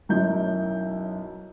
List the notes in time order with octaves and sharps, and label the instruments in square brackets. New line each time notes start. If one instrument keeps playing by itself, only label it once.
[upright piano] B1 F#2 F#3 E4 G6